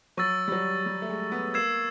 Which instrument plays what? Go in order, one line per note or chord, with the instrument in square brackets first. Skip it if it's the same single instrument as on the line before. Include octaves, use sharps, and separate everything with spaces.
[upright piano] F#3 [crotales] C#6 E6 A6
[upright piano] G3
F#3
G3
A3
G#3
B3
[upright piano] A#3 [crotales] E6 G#6 C7 E7